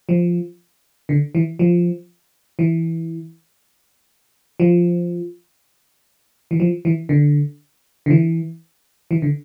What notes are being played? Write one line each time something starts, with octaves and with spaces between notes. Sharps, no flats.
F3
D3
E3
F3
E3
F3
E3
F3
E3
D3
D3
E3
E3
D3